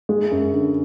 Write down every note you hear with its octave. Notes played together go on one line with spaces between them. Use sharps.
G#3
F#2
D3